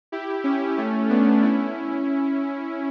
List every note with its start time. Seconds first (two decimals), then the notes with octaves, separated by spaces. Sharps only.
0.12 E4 G4
0.44 C#4 E4
0.77 A3 C#4
1.09 B3 D4
1.42 C#4 E4